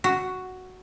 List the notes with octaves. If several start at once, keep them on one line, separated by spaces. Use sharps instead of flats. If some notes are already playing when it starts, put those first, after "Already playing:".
F#4